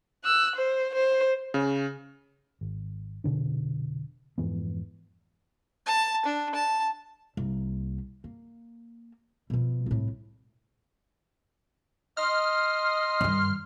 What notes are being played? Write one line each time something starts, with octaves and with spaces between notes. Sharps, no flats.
E6 F#6
C5
C5
C#3
G#1
F1 B2 D3 D4
F2 G#2 E3 B3
A5
D4
A5
C2 A#3
A#3
B2 F3
C2 A2
D#5 C6 F6
G2 D#3